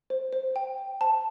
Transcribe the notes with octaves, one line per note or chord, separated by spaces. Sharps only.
C5
C5
G5
G5
C5 A5